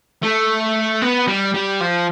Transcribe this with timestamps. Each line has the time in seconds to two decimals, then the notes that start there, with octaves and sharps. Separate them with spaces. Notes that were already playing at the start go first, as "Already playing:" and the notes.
0.23 A3
1.02 B3
1.27 G3
1.54 G3
1.80 F3